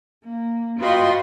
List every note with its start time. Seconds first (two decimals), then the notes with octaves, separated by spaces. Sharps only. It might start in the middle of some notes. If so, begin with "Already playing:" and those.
0.24 A#3
0.79 F4 F#4 B4 D#5 G5 C6